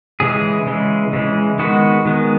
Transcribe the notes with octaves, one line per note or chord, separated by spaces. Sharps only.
C#3 E3 G#3 G#4
C#3 E3 G#3
C#3 E3 G#3
D#3 G#3 B3 F#4
D#3 G#3 B3